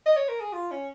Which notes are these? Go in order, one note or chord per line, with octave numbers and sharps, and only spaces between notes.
D#5
C#5
A#4
G#4
F4
C#4